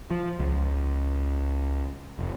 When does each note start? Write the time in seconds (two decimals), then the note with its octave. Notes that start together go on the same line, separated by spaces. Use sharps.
0.11 F3
0.40 C#2
2.19 F1